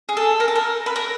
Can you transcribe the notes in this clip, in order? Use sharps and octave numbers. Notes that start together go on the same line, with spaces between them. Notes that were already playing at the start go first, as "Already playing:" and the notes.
G#4
A4
A#4
A4
A#4
B4
A#4